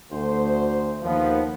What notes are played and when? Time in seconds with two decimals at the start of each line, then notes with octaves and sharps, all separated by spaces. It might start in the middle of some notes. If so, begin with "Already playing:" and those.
0.12 D2 C5
1.03 D#2 F3 B3